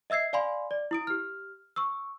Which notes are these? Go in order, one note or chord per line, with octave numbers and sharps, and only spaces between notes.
D#5 E5 E6 G#6 C7
D5 F5 G#5 B5 C6
D5
E4 D#6 D7
G4 F6
C#6 E6